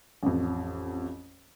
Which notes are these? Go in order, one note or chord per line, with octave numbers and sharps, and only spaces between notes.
A1 F2